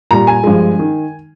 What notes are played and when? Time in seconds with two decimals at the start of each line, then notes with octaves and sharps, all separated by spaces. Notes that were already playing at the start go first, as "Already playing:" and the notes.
0.11 A#2 G3 A#5
0.27 G#5
0.44 G2 F3 G#3
0.79 D#3